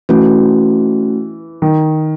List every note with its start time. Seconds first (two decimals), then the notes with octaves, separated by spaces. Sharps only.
0.09 E3 A3 C#4 F#4
1.62 D#3